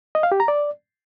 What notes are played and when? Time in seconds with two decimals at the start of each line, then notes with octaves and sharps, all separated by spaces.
0.15 D#5
0.23 F5
0.32 G4
0.40 A#5
0.48 D5